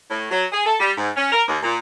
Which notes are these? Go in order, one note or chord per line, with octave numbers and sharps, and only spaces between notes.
A2
F#3
G#4
A4
G3
G#2
C#4
A#4
D#2
A#2